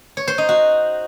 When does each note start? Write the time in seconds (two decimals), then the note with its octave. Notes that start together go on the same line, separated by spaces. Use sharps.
0.17 C#5
0.28 C5
0.38 D#4
0.49 F#4